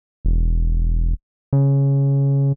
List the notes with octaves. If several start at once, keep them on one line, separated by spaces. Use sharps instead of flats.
E1
C#3